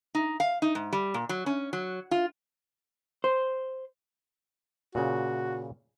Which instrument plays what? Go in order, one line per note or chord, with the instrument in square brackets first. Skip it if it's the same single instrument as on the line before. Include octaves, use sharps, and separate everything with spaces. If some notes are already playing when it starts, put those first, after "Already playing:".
[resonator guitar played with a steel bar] D#4
F5
D#4
G#2
G3
A#2
F#3
C#4
F#3
F4
[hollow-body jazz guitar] C5
[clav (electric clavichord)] A#2 C#3 [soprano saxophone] F#4